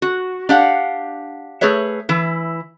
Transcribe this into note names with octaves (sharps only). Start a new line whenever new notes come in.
F#4
D4 G4 F5 F#5
A3 G#4 B4 C#5 E5
E3 E4